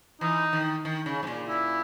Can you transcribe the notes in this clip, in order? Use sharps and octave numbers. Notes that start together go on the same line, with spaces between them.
E3 D#4
D#3
D#3
C#3
G#2
A#2
E4